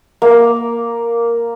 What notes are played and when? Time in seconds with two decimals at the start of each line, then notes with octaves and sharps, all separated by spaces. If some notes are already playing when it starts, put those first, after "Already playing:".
0.22 A#3